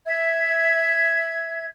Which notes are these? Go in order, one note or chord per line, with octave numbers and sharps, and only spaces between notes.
E5 G#6